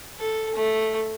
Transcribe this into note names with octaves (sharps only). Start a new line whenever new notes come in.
A4
A3